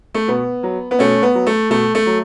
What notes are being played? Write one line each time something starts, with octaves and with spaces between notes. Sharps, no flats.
A3
B2 B3
F#3
B3
B2 A3 C#4
B3
F#3
A3
B2 A3
A3
F#3